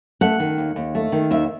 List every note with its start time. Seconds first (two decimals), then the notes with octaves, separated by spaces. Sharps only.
0.21 A3 F#5
0.40 D#3
0.58 D#2
0.76 D#2
0.95 A3
1.12 D#3
1.31 D#2 E5